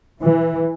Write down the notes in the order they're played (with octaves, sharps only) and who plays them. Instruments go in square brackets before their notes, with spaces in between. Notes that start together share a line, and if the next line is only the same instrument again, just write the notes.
[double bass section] E3